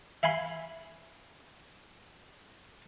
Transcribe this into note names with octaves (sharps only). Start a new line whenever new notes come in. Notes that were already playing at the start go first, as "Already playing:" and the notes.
E5 F5 G#5 B5 C6